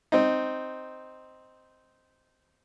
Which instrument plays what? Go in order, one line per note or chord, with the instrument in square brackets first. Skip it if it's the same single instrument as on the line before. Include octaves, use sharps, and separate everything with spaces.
[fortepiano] C4 D#4